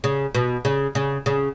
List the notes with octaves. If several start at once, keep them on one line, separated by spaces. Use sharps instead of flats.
C#3
B2
C#3
C#3
C#3